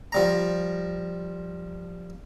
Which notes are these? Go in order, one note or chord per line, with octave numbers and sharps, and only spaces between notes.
F3 G3 A#5